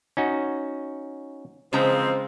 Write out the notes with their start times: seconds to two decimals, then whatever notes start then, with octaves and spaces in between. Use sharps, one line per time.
0.17 C#4 D#4 F#4
1.73 C#3 E3 F3 G#3 C4 A#5